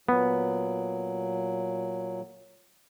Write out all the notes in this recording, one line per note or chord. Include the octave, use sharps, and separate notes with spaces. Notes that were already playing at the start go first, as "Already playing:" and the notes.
A#2 F#3 B3